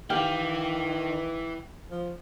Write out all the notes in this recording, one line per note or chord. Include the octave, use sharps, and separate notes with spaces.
D#3 E3 G4 F5 G5
F3